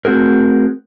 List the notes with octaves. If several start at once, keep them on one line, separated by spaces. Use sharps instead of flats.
A3 C4 F#4 G#4 A#4